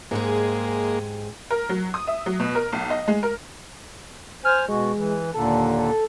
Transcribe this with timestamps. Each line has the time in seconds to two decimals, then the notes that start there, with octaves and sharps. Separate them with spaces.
0.11 G#2 G#3 A#3 G4 G#4
1.51 A#4
1.69 F#3
1.94 D#6
2.07 E5
2.26 F#3
2.40 B2
2.55 A#4
2.72 B1
2.90 D#5
3.08 G#3
3.23 A#4
4.45 C5 G#5 F6
4.68 B2 G#3 F#4
4.96 E3
5.34 D#2 A#2 D3 A4
5.78 A4